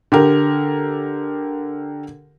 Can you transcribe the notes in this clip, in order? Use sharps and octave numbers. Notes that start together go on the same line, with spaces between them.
D3 G4 A#4